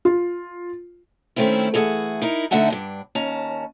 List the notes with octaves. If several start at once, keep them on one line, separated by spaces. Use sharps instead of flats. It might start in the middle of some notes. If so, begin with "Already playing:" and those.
F4
D#3 A3 C4 C#4 E4
E3 A3 G#4 E5 F#5
D#4 E4 A#4
D3 A3 D#4 E5 F#5 A5
G2 A#2 D4
D#2 C#4 A5 A#5